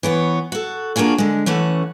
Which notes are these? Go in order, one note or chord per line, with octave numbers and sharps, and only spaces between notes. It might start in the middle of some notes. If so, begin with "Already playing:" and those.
E3 B3 C#5
F#4 A4
A#3 D4 F4 F#4 G#4
D3 G#3
E3 A3 C#4 A4 F#5